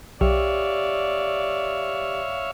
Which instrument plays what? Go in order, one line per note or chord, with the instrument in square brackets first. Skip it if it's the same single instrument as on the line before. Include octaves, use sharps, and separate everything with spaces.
[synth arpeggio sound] B1 [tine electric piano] G4 [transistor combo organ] C#5 E5 F5 [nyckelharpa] D5